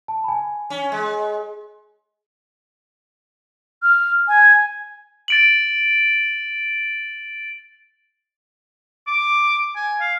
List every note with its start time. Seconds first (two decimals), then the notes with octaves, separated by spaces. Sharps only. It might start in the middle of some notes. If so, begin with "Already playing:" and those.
0.08 A5
0.24 G#5 B5
0.70 C#4
0.92 G#3
3.83 F6
4.28 G#5
5.28 A6 D7 F#7
9.07 D6
9.76 G#5
10.01 F5